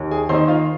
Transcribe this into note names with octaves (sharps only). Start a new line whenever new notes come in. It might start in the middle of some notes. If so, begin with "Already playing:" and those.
Already playing: D#2
G#4 G#5
D#3 A#3 D#4 C5 C6
F4 F5